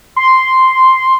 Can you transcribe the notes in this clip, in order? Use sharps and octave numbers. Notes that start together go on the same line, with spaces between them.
C6